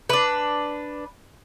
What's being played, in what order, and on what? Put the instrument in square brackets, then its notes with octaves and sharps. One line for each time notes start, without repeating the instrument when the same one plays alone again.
[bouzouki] D4 B4